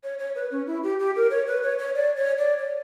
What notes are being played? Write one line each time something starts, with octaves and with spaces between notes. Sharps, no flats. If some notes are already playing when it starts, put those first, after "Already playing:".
C#5
C#5
B4
C#4
E4
G4
G4
A#4
C#5
B4
C#5
C#5
D5
C#5
D5
C#5